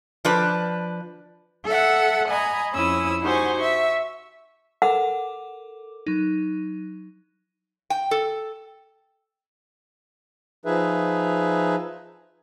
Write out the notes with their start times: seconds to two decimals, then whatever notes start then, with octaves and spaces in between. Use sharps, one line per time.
0.25 F3 D4 B4
1.66 A4 E5 F#5
2.30 D#5 G#5 A#5 B5
2.74 F2 C#4 E4 D#6 E6
3.22 D#4 F#4 G4 C5 G#5 C#6
3.58 E5 C#6
4.82 A4 A#4 F#5 D6
6.07 F#3 D#4
7.90 G5
8.11 A4
10.65 F3 D#4 G#4 B4 E5